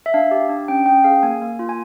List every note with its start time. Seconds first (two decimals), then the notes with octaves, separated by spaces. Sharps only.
0.06 E5
0.14 D4 F5
0.31 G4
0.50 D4
0.68 C#4 G5
0.86 C#4 G5
1.04 G#4 F5
1.23 A#3 G#5
1.42 A#3
1.59 F4
1.69 G#5